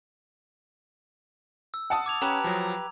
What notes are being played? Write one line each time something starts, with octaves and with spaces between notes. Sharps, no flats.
E6
F#5 A5 D#6
D6 G#6 F7
C#4 G4 B4 A#5
F3 F#3